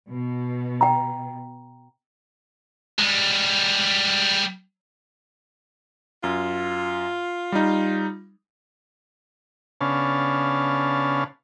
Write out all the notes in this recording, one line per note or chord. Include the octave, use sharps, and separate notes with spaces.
B2
G5 A#5
G3 G#3
F#2 F4
G3 D#4
C#3 B3 C#4 D4 F5 A5